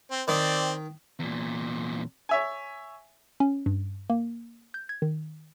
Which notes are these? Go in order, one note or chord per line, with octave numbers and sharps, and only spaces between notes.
C4
D#3 C4 D5
E2 A#2
C#5 E5 G#5
C#4
G2
A#3
G6
G#6
D#3